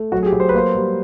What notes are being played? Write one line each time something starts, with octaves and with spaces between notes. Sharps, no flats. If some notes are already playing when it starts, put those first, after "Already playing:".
Already playing: A3
F#3 F#4
G#4
G4
F#3
C5
B4
A#3 C5
G3